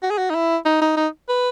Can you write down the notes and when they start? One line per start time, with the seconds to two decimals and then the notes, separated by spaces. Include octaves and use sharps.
0.03 F#4
0.11 G#4
0.18 F#4
0.30 D#4
0.35 E4
0.66 D#4
0.81 D#4
0.97 D#4
1.29 B4